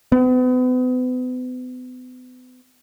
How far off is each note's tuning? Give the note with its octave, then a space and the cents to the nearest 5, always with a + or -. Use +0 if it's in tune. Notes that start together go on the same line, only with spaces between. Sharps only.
B3 +40